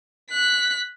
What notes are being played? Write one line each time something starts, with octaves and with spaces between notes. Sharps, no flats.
F#6 B6